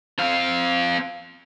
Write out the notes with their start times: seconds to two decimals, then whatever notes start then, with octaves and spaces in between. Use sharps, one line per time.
0.19 C4 F5